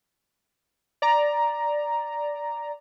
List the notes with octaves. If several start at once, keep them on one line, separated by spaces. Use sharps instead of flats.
D5 A#5